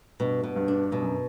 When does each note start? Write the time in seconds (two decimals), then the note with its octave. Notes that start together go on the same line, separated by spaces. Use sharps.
0.20 G2 B2
0.43 B2
0.56 G2
0.68 D4
0.92 G2 B2
1.02 F#2